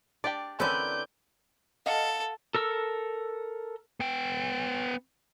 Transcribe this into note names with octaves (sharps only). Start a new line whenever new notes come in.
D4 G4 D5 G5
D3 C4 C#4 E4 A#4 B4 D5 G6
A4 D#5 F5 F#5
A4 A#4 E6
B3 G5